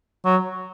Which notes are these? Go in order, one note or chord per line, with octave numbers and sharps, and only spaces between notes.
F#3